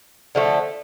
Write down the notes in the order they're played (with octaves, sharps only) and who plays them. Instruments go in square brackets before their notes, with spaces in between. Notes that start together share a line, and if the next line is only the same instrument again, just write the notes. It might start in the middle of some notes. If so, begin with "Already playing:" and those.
[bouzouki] D3 F3 A3